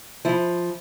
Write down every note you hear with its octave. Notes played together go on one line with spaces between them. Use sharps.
F3 E4